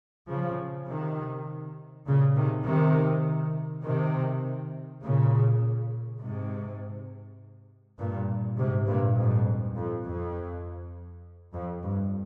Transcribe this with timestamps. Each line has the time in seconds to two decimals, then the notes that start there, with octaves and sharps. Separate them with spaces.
0.30 C#3 F3
0.89 C3 D#3
2.07 A#2 C#3
2.37 C3 D#3
2.66 C3 D#3
3.85 C3 D#3
5.03 A#2 C#3
6.22 G#2 C3
7.99 G2 A#2
8.58 G#2 C3
8.88 G2 A#2
9.18 F2 G#2
9.77 F2
10.06 F2
11.54 F2
11.84 G2